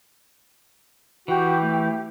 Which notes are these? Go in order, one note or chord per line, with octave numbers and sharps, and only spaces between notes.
E3 F#4 G4
A3